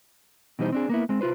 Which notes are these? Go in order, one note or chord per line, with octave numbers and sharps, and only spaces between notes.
B2 E3 G3 D#4 C5
C4 D4 G#4
A#3 B3 E4
G#3 C4
C2 F4 B4 C5